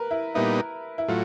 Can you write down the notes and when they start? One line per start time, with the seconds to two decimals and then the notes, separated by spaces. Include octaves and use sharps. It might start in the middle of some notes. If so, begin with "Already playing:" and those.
Already playing: A#4 B4
0.11 E4
0.34 A#2 G3 B3 D#4 E4
0.98 E4
1.08 A2 F#3 F4